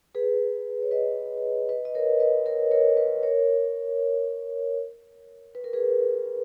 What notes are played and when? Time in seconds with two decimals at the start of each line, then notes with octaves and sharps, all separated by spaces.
0.15 G#4 B4
0.82 C#5
0.91 B4 D#5
1.69 B4 D#5
1.85 D#5
1.95 A#4 C#5
2.20 B4 D#5
2.46 A#4 C#5
2.71 A#4 C#5
2.97 B4 D#5
3.23 A#4 C#5
5.55 B4
5.64 A#4
5.73 G#4 B4